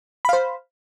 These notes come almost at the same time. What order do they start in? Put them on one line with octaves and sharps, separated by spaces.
B5 F5 C5